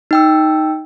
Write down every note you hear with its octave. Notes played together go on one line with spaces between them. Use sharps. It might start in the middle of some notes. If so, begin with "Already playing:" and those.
D#4 G5 E6